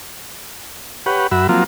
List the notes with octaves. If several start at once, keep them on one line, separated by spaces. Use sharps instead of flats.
G4 B4 C#5 F#5
F#2 F#4 E5 B5
F3 F#3 A#3 C4 F4